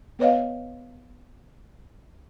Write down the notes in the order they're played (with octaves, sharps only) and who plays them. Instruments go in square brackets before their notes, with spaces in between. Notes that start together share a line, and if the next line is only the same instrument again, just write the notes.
[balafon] B3 B4 C#5 D#5 F5